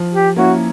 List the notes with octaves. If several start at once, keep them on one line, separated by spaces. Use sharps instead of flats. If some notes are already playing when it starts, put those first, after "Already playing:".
Already playing: F3
G4
A#3 C#4 E4 F#4